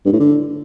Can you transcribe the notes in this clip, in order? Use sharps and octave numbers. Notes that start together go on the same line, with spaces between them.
G2
A2
D3